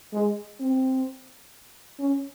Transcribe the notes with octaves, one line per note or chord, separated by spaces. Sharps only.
G#3
C4
C#4